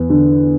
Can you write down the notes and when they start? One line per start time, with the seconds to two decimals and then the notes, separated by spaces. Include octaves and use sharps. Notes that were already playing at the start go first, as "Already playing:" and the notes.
Already playing: E2
0.10 D3